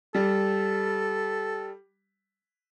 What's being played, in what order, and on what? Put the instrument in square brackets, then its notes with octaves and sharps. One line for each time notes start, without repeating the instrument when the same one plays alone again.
[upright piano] G3 [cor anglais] A4